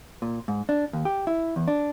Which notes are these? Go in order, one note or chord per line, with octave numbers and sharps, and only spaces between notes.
A#2
G#2
D4
D#2
G4
E4
E2
D4